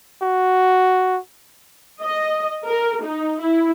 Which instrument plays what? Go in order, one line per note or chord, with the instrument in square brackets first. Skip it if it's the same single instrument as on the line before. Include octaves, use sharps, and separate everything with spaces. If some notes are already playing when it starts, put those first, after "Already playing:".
[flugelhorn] F#4
[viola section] D#5
A#4
D#4
E4